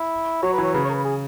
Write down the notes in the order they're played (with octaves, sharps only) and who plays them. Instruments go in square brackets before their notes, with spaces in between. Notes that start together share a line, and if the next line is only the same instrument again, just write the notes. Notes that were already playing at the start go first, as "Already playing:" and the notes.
Already playing: [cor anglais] E4
[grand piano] F#3 [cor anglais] C#5
[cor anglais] B4
[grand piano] E3
[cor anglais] C#5
[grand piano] C#3 [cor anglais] B4
[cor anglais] C#5
A#4
B4
G#4